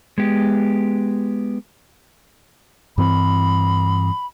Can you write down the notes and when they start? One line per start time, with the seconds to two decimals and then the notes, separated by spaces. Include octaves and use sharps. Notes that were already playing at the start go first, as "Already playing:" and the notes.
0.18 G#3 B3 G4
2.98 G2 E3 C4 B5